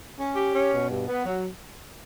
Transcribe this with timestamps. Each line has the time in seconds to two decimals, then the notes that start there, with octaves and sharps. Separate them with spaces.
0.18 C#4
0.36 G4
0.54 C#4
0.72 B2
0.90 G2
1.08 B3
1.26 F#3